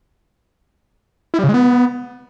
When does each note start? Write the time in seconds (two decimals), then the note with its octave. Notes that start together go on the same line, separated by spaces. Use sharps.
1.34 E4
1.39 G3
1.44 C#3
1.49 G#3
1.54 B3